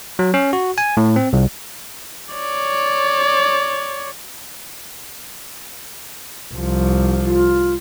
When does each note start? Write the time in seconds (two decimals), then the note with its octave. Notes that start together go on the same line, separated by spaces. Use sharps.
0.19 F#3
0.34 C#4
0.53 F#4
0.78 G#5
0.97 A2
1.16 C4
1.33 C2
2.34 C#5 D5
6.53 C2 F3
7.25 F4